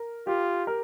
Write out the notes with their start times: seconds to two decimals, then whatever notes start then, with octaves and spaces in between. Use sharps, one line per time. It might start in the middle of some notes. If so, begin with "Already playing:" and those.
Already playing: A#4
0.27 F4 G4
0.67 A#4